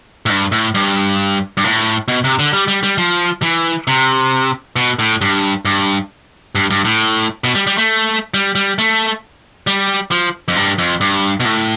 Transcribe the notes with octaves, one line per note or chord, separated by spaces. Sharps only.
A2
G2
A2
G2
G2
A2
B2
C3
D3
G3
G3
G3
F3
E3
C3
B2
A2
G2
G2
G2
G2
A2
B2
G3
G3
A3
G3
G3
A3
G3
F3
F2
G2
F2
G2
B2
A2